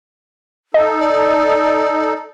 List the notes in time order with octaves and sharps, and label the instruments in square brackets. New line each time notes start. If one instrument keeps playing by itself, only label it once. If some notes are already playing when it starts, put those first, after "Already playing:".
[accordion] D#4 A4 [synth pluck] D#5
[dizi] D5